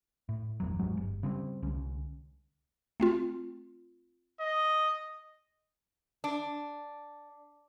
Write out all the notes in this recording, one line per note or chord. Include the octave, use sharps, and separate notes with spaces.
A2
F#1 E2 F#3
D#2 G#2 F#3 G#3
G1
C#3 G3 G#3 C4
C2 D3 C#4
A3 C4 F4
D#5
D4